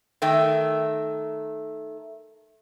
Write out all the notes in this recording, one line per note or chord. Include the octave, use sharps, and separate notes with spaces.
D#3 A3 G5